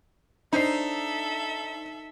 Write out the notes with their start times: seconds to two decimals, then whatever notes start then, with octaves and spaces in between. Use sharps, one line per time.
0.53 D4 D#4 A4 C5 E5 C7